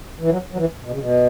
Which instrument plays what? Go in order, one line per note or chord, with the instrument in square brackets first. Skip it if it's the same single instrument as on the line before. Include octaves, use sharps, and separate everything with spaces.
[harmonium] E3
F#3
F#3
E3
B2
C#3
B2